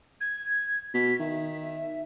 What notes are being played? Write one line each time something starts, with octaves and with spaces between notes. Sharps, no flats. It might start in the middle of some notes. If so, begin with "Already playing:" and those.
G#6
B2 B6
D#3 E5